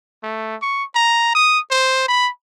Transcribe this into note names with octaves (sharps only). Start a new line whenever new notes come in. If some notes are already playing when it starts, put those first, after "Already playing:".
A3
C#6
A#5
D#6
C5
B5